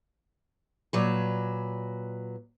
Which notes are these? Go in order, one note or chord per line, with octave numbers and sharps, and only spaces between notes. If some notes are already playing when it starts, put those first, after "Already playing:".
A#2 F#3 B4